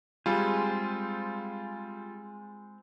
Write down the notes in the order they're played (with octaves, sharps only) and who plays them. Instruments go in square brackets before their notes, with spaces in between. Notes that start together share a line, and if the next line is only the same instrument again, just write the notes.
[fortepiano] G3 [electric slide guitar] G#3 C4 G#4 [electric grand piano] F4